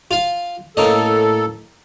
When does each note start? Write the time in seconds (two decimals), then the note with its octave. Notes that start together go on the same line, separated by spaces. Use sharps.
0.11 F4 F5
0.77 A2 A#3 C#4 A4 D#5